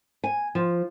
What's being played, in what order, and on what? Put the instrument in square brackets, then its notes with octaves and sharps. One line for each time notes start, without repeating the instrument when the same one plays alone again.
[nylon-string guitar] G#5
F3